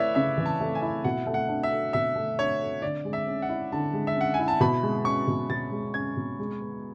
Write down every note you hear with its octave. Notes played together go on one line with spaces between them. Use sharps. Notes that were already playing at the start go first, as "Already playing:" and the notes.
Already playing: A3 E4 B4 C#5 D5 E5
C#3 E5
E3
A5
A3
G#5
E4
B2 F#5
A3
F#5
D4
E5
A4
B2 E5
A3
D4 C#5
A4
D3 D5
G#3
E5
C#4
F#5
E4
D3 A5
G#3
E5
C#4 F#5
G#5
E4
A5
B2 B5
G#3
C#4 C#6
B2
B2 A6
G#3
C#4 G#6
B2
G#3
B3